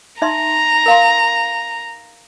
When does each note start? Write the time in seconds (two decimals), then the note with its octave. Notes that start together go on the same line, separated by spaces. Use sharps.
0.22 D#4 E5 A#5 C6
0.86 A#4 F5 C6